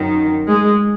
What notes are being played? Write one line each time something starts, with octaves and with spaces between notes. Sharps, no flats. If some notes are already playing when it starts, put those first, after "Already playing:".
Already playing: F#2 D#3
G#3